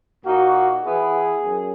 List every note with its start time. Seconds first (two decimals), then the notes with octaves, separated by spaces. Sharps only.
0.24 A#2 A#3 D#4 F#4
0.84 E3 B3 E4 G#4
1.44 F#2